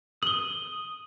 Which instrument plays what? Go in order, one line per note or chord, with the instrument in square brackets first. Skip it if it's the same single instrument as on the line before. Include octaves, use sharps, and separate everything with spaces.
[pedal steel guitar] D#6 [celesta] F#7 G7